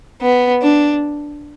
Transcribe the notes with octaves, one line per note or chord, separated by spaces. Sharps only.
B3
D4